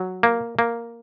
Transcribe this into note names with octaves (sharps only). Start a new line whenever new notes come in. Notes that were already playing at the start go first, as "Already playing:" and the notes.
Already playing: F#3
A#3
A#3